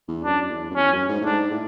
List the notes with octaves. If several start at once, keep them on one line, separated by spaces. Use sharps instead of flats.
E2
F#2 D4
E2
F#2
E2 C#4
F#2
G#2
A2
G#2 D4
A2